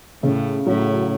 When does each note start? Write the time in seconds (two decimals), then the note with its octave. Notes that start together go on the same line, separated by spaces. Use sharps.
0.23 A2 C#3
0.66 A2 F#3